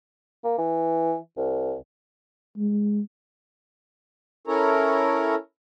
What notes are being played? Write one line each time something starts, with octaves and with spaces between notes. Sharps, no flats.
A#3
E3
C2
G#3
C#4 E4 A4 A#4 C#5 A#5